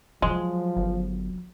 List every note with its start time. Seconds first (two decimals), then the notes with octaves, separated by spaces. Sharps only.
0.22 F3 F#3 G#3
0.77 G1